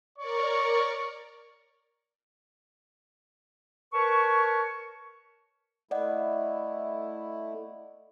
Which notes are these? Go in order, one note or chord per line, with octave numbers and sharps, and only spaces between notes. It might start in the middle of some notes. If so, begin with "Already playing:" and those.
A#4 C#5 D5 C#6
A#4 B4 C#5 A5 C#6
A3 E4 D5 D#5 F#5